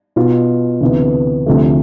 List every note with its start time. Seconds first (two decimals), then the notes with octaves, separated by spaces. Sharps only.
0.16 B2 B3 F4
0.81 D2 C3 E3 B3
1.46 D2 C3 F3 A3